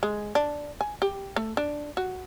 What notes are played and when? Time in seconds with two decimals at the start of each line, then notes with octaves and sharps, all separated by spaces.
0.03 G#3
0.35 D4
0.81 G#5
1.02 G4
1.36 A3
1.57 D4
1.97 F#4